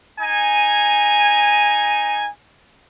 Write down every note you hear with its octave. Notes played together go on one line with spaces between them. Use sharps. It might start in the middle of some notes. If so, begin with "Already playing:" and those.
D#4 G#5